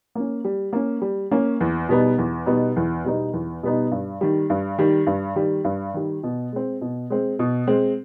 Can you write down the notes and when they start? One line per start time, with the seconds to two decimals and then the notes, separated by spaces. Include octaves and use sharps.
0.15 A#3 C#4
0.45 G3
0.73 A#3 C#4
1.02 G3
1.31 A#3 C#4
1.60 E2
1.89 B2 G3 B3 D#4
2.18 E2
2.46 B2 G3 B3 D#4
2.76 E2
3.04 B2 G3 B3 D#4
3.33 E2
3.63 B2 G3 B3 D#4
3.91 G2
4.21 D#3 G3
4.50 G2
4.78 D#3 G3
5.07 G2
5.36 D#3 G3
5.64 G2
5.94 D#3 G3
6.23 B2
6.52 G#3 C4
6.81 B2
7.10 G#3 C4
7.39 B2
7.67 G#3 C4